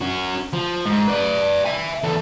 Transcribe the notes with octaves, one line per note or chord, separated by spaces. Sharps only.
C#4 F#4
F3
G#2
B4 D5
E5 G#5
E2 A4